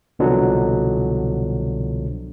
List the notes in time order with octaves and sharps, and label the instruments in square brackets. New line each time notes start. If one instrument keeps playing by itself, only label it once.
[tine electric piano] C2 B2 D3 F3 F#3